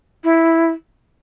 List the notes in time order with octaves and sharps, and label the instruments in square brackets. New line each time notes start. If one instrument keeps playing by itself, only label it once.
[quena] E4